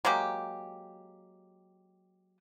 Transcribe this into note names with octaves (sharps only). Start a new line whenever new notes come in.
F#3 G#3 A#3 G4